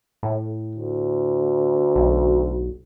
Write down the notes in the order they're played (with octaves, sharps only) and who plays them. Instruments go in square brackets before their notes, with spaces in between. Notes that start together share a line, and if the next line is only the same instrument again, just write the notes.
[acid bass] A2
[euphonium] D2
[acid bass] B1